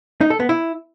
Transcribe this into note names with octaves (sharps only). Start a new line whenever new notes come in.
D#4
A4
B3
E4